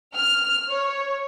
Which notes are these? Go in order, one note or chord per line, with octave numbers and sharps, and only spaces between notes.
F6
C#5